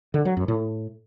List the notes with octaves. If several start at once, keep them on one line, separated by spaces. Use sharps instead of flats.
D3
F#3
F#2
A2